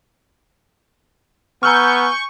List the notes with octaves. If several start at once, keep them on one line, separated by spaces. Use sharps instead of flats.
B3 G#5 A#5 C#6 E6 F6 G6